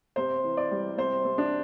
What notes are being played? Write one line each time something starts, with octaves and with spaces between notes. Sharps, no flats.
C3 C5
E3
D5
G3
C3 C5
C3
D4